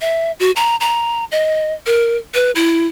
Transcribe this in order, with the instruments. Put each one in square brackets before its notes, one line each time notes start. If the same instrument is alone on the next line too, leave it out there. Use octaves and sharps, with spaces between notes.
[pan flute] E5
F#4
A#5
A#5
D#5
A#4
B4
E4